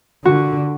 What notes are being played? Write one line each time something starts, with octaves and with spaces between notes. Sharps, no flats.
D3 F#4